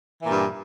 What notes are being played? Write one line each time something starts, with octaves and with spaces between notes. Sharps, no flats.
G2 A#2 E3